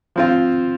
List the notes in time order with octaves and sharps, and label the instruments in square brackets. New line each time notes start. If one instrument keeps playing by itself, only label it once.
[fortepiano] F3 C4 F4